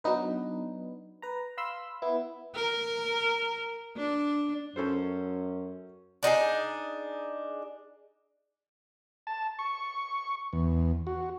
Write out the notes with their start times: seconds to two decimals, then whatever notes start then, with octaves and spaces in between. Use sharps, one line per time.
0.04 F#3 B3 D4 D#4 B4
1.22 B4 A#5
1.58 F5 B5 C6 E6
2.02 B3 E4
2.55 A#4
3.97 D4
4.76 F#2 C#4 A4 C5
6.23 D4 D#4 F#4 G#4
9.27 A5
9.59 C#6
10.53 E2
11.07 F#4